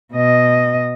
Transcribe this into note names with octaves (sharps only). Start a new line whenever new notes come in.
B2 D#5